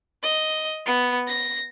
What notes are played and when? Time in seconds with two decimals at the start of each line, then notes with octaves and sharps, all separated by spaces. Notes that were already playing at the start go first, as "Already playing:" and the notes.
0.23 D#5
0.86 B3
1.27 A#6